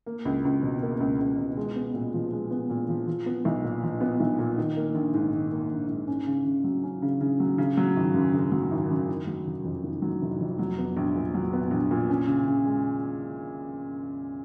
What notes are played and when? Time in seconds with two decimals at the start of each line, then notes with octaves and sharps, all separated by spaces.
0.06 A#3
0.25 C#2
0.45 C#2
0.63 B2
0.82 A#3
1.00 C#2
1.20 C#2
1.38 B2
1.57 G#3
1.76 B3
1.94 A#2
2.14 F3
2.32 G#3
2.51 B3
2.70 A#2
2.89 F3
3.07 F3
3.26 B3
3.45 B1
3.64 A#2
3.83 F3
4.01 B3
4.20 B1
4.39 A#2
4.58 D#3
4.77 A#3
4.95 A#1
5.14 G#2
5.33 D#3
5.52 A#3
5.70 A#1
5.89 G#2
6.07 C#4
6.27 C#3
6.45 C#3
6.64 F#3
6.83 C#4
7.02 C#3
7.21 C#3
7.40 F#3
7.58 C#3
7.77 F#3
7.96 G#1
8.14 F#2
8.33 C#3
8.52 F#3
8.71 G#1
8.90 F#2
9.09 D#3
9.27 F#3
9.47 F1
9.64 F2
9.84 D#3
10.02 F#3
10.22 F1
10.40 F2
10.59 F#3
10.78 B3
10.97 A#1
11.16 A#2
11.34 F#3
11.53 B3
11.71 A#1
11.91 A#2
12.09 C#4
12.27 C#3
12.47 C#3
12.66 G#3